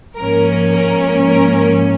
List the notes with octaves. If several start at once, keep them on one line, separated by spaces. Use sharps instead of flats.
G#2 F3 A#3 C#4 A#4
A#4
A#4